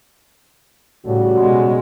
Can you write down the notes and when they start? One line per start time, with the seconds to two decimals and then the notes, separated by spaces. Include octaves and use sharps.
1.06 A2 C#3 G3 F#4
1.40 B2 G#3